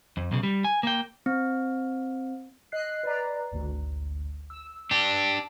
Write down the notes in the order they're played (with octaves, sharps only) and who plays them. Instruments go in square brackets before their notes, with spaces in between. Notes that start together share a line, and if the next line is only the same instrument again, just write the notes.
[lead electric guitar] F2
B1 C#3
G3
G#5
A#3 G5
[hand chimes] C4
[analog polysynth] D#5 F#6 C7
B4 D5 A#5
G#1 D2
E6
[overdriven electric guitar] D4 G4